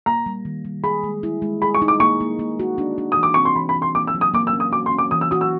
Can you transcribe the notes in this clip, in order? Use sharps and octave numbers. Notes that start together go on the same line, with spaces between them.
A#3 A#5
G3
D#3
G3
G#4 B5
G#3
E4
G#3
G#4 B5
C#6
D#4
D6
A#3 C#6
A#3
A#3
F#4
D4
D4
D#6
E3
D6
C4 C#6
C6
E3 B5
B5
E3
C6
A#3 D6
E6
F#3
D#6
A#3 D6
E6
C#4
D#6
F#4 D6
C6
C#4
D6
E3 D#6
E6
F#4 D#6
E6